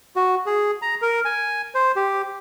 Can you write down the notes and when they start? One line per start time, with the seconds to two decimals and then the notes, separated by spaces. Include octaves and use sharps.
0.16 F#4
0.46 G#4
0.82 A#5
1.02 A#4
1.25 G#5
1.75 C5
1.96 G4